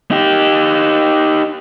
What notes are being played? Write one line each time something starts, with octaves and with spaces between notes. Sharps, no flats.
D#4 G4